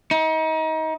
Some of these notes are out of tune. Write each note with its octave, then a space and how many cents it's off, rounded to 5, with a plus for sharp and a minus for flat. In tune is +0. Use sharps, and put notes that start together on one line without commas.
D#4 +30